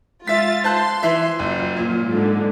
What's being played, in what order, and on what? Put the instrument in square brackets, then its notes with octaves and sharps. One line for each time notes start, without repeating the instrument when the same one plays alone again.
[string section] G#3 F4 A6 [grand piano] E5 B6
[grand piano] C5 A5 F#6 [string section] C6
[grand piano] E3 E5
[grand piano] F#1 [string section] F#3 F4
[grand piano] A#2
[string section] G#2 D3